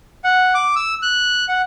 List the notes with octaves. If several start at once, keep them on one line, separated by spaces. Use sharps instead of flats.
F#5
D6
E6
F#6
F#5